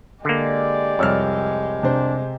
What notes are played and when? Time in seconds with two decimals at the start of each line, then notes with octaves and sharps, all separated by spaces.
0.25 D3 G#3 A#3 G4 D5
0.99 C2 F2 C#5 E6 F6
1.83 C3 D4 C5